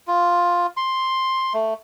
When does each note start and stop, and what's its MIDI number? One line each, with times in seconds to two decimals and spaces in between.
0.07 0.67 65
0.77 1.53 84
1.54 1.74 57